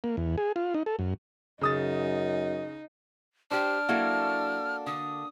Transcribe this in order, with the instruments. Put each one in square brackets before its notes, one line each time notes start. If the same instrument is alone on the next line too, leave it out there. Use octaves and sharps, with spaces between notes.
[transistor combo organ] A#3
E2
G#4
F4
D#4
A4
F#2
[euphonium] F#2 [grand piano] C#3 D#6 A6 [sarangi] D#4
[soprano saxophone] D4 [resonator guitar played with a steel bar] G4 C5 [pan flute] F6
[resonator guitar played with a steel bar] F#3 E4 [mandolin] A#3 F#4 A4
[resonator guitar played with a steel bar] D3 [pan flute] D#6